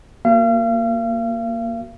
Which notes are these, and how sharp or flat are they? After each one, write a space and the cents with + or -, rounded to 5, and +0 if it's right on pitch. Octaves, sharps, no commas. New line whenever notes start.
A#3 +0 F#4 +0 F5 -40